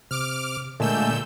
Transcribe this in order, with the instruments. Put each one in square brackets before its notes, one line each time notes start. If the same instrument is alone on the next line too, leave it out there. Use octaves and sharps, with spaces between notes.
[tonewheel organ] C3 [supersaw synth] D6 F6
[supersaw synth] A#2 E6 G6 [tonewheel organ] D3 G#3 A3